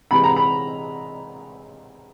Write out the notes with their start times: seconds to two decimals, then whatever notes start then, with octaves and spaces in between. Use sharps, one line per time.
0.11 C3 E3 G#3 B5
0.24 A#5
0.37 B5